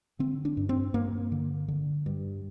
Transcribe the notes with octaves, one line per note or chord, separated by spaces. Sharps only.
D3 C4
D4
G2
C4
G2 A#3
D3
D3
G2